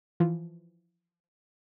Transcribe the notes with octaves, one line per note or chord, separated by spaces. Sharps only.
E3 F3